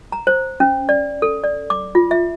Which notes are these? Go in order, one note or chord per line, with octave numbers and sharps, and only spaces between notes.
A#5
C5
C#4
D5
A4
D5
D6
F4
E5